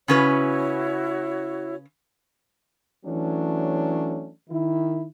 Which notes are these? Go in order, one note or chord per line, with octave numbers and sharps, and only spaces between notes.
C#3 C#4 E4 F#4 B4 C#5
E3 F#3 A3 C#4 D4
D#3 E4